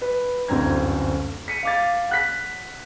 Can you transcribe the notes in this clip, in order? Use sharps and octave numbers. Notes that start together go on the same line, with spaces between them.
B4
D1 G1 F#2 C4 A#5 G#6
B6 C#7 D#7
F5 D6 A6
F#5 F#6 B6